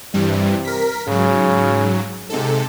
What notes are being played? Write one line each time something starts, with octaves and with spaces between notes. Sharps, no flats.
G2 C3 E3 G3
A#4 B6
G#2 C#3 F#3
G#2 C3 A4